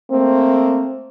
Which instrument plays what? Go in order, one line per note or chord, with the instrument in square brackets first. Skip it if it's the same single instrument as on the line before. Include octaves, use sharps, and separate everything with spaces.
[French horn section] A3 A#3 C4